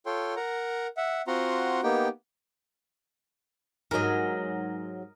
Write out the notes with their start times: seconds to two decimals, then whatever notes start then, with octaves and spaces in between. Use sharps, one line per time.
0.06 F4 A4 C#5 G5 C6
0.36 A#4 F#5 A#5
0.97 E5 F#5
1.27 C4 F4 F#4 F#5 A#5 C6
1.83 A#3 B3 D#4 G4 G5
3.91 G#2 F#3 A#4 D#5